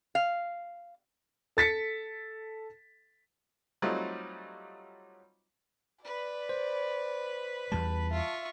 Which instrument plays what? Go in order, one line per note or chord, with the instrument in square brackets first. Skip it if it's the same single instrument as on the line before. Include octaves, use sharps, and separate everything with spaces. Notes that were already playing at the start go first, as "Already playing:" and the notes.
[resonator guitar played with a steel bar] F5
[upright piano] A4 A6 B6 C#7
[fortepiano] F#3 G3 A3 C4 D#4 F4
[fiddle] B4 B5 [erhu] D5
[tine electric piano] C5
[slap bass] E2 G3 [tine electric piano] A5
[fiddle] F4 C#6 [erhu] E5